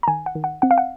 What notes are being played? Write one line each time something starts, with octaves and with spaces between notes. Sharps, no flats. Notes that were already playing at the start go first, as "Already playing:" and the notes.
A#5
D#3 G#5
F#5
D#3
F#5
C4 F#5
F5
F#5